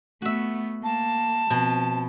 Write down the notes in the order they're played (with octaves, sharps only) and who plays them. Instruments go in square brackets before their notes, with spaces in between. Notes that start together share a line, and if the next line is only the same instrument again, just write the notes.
[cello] A3 B3 [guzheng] F#4 E5
[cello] A#3 [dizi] A5
[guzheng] B2 [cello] F3 C4